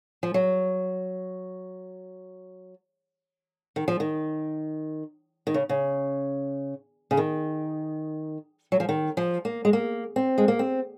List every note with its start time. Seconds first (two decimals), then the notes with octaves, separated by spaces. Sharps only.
0.23 F3
0.34 F#3
3.76 D#3
3.88 F3
4.00 D#3
5.47 D#3
5.54 C#3
5.69 C#3
7.11 C#3
7.17 D#3
8.72 F#3
8.80 F3
8.89 D#3
9.17 F3
9.45 A#3
9.65 G#3
9.73 A#3
10.16 C4
10.38 G#3
10.48 A#3
10.59 C4